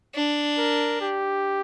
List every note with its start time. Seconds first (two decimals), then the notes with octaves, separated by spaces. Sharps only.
0.15 D4
0.58 A#4
1.01 G4